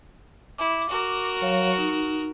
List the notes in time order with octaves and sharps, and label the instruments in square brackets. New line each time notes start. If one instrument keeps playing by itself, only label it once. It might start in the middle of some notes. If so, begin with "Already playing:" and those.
[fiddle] E4 [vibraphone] D6
[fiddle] F#4 A#4
[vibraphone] F#3 C#5 F5
D#4